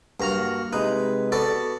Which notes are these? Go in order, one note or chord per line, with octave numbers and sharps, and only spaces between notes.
G2 A#3 F#4 A#5 F6
C3 G#3 D#4 B4
B3 F#4 A4 B4 D5